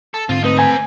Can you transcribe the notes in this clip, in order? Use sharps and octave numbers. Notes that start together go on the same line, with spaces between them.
A4
G#2 D3 C4 F4
A3 C4 D#4 B4
C5 G#5 A#5